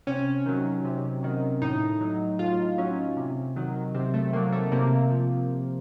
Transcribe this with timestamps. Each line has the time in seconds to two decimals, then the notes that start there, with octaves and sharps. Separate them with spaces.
0.07 C3 C#4
0.46 D#3 F#3
0.85 C3
1.23 D#3 F#3
1.62 A2 D#4
2.01 F#3
2.39 A2 F4
2.78 F#3 C#4
3.16 C3
3.56 D#3 F#3
3.94 C3 C4
4.14 A3
4.33 D#3 F#3 A#3
4.52 A3
4.72 C3 A#3
5.11 F3